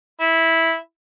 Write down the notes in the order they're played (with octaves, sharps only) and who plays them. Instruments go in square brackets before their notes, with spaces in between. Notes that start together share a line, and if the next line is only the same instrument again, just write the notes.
[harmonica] E4